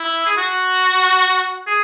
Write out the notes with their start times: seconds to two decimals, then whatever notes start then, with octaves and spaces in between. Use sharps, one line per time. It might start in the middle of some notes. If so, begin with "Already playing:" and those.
Already playing: E4
0.26 G#4
0.37 F#4
1.67 G#4